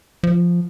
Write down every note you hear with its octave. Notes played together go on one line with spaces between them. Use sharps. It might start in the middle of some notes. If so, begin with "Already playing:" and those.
F3